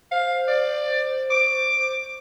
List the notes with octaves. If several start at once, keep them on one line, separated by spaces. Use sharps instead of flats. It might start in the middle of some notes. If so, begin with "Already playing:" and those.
C5 F5
D5
D6